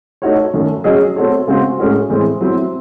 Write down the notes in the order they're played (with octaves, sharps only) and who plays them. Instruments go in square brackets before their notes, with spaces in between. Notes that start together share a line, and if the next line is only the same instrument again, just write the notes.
[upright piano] A3 D#4 F#4 C#5
F#2 D#3 A3
F#3 C#4 G#4 D#5
A3 C4 F#4 A4 C#5
C#3 G#3 C4 F#4
A2 G#3 C#4 F#4
A2 E3 G#3 C4
F#3 C4 E4